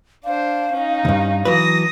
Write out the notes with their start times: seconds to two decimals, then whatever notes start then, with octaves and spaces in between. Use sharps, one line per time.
0.25 D4 C5 F5
0.73 C#4 D#4
1.05 D2 G2
1.45 E3 F#3 B4 D#6 A#6